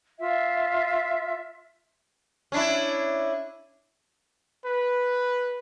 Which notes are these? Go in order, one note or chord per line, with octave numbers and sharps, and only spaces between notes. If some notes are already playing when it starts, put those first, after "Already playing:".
F4 E5
C#4 D4 E4
B4